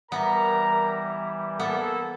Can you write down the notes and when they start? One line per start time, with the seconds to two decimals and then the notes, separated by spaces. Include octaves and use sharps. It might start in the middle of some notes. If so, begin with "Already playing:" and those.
0.12 E3 G3 B3 A#4 A#5
1.60 A#3 B3 A4